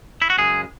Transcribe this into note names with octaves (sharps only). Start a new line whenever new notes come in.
E4
F#4
F#2 C#3 G#3 G#4